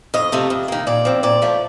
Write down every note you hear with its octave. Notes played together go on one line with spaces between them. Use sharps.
F2 D#5
C3 F3 A3
F2
D#3 A#3
A#2 D5
F3 C4
A#2 D5
F3 A3